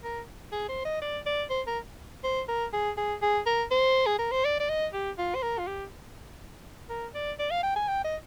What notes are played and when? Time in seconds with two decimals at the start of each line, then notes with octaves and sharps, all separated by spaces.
0.03 A#4
0.52 G#4
0.68 C5
0.85 D#5
1.01 D5
1.26 D5
1.50 C5
1.67 A#4
2.24 C5
2.48 A#4
2.73 G#4
2.97 G#4
3.22 G#4
3.46 A#4
3.71 C5
4.06 G#4
4.19 A#4
4.32 C5
4.45 D5
4.60 D5
4.69 D#5
4.93 G4
5.18 F4
5.35 C5
5.42 A#4
5.58 F4
5.67 G4
6.89 A#4
7.14 D5
7.39 D5
7.51 F5
7.63 G5
7.76 G#5
7.88 G5
8.04 D#5